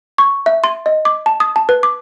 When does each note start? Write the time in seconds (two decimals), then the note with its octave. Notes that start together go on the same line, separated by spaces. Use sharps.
0.18 C#6
0.46 E5
0.64 C6
0.86 D#5
1.05 D6
1.26 A5
1.40 D#6
1.56 A5
1.69 B4
1.83 D6